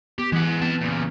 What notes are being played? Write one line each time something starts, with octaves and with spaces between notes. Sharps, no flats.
B3 G4
E3 G#3 F#5
B3 C4 A5
A#2 C#3